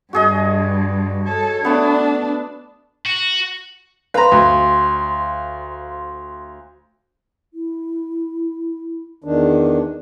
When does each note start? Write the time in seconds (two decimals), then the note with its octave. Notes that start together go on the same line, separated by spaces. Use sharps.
0.13 G2 F#4 G#4 D#5
1.27 A4 C#5
1.65 A3 B3 D4
3.06 F#4
4.14 B4 C5 F5 A#5
4.31 D2
7.54 E4
9.24 E2 D#3 D4